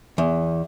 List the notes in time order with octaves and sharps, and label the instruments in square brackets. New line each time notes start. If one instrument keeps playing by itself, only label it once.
[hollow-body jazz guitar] E2